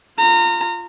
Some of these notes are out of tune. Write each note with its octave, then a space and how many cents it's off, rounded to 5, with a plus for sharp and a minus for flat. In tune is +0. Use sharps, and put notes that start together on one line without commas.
F4 +0 A#5 -25